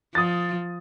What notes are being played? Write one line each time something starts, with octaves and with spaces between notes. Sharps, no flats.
F3 D#6 A6